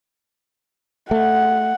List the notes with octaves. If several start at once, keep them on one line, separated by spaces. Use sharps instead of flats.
A3 F#5